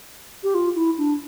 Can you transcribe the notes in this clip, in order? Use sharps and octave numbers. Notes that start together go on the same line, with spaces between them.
G4
F4
E4
D4